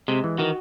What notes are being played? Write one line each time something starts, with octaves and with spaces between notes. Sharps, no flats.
C3 G#3
E3
D#3 F#4